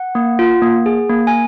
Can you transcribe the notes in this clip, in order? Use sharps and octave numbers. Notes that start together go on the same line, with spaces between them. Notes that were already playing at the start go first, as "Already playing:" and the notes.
Already playing: F#5
A#3
F4
A#3
G#4
A#3
G#5